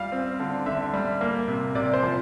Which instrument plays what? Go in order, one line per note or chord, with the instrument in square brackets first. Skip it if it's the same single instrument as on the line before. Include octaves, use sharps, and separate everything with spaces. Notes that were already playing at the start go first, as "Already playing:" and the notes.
Already playing: [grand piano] G3 F4 F5
C4
D3
D3 E5
G3
A#3
C3
C3 D5
C5
F3